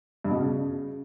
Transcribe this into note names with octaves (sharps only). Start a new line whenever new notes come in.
G2
B2
C#3